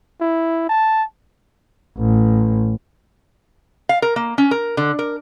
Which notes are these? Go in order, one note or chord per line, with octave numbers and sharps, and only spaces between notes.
E4
A5
A1
F5
A#4
A#3
C#4
A#4
D3
A#4